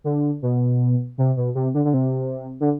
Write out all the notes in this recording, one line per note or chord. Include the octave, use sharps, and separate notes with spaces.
D3
B2
C3
B2
C3
D3
D3
C3
D3